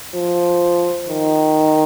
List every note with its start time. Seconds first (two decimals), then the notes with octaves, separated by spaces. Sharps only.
0.15 F3
1.09 D#3